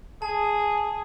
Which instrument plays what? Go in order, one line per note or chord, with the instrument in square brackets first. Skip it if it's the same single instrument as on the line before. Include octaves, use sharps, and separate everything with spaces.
[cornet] G#4 [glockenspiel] A5